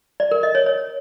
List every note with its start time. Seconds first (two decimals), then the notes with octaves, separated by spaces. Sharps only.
0.20 D5
0.31 A#4
0.43 D#5
0.55 C#5
0.66 C#5